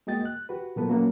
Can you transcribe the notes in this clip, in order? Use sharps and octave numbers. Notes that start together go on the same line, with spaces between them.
G#3 A#3 F#4 D#5 G5 A6
F#6
F#4 G4 B4
A#2 F#3 A#3 B3 A4 B4
F#3 A3 A#3 C#4 F#4